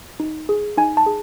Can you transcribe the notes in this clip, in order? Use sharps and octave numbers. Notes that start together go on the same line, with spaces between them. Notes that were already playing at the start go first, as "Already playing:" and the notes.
D#4
G#4
D#4 G#5
A5
G#4